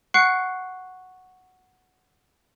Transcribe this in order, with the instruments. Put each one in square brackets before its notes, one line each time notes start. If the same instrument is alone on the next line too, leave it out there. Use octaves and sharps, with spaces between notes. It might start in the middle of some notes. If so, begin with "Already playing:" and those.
[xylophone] F#5 C#6 F#6 C7 C#7